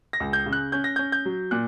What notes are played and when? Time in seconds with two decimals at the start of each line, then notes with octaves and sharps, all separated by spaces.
0.13 A#6
0.20 C#2
0.33 G6
0.46 C#3
0.53 F#6
0.72 C#4 G6
0.84 A#6
0.96 C#4 G6
1.12 G6
1.25 F#3
1.51 A#2 F#6